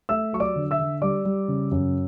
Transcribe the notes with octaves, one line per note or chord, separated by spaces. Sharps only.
A3 E5 E6
F#3 C#6
D5 D6
D3
E5 E6
D3
G3 D5 D6
G3
C#3
F#2